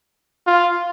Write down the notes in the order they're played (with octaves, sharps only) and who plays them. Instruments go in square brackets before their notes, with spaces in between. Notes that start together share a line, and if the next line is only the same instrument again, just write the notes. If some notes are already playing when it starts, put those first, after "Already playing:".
[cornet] F4